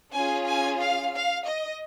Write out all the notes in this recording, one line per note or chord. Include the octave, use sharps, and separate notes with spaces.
C#4 F4 G#4 G#5
G#5
F5
F5
D#5